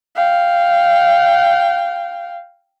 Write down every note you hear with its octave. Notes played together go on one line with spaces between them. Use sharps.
F5 G5